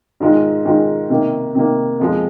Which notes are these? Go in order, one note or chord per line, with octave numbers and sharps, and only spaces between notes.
G#2 D#3 G#3 F4
G#2 D#3 G#3 F4
C3 D#3 A#3
C3 D#3 A#3
F2 F3 G#3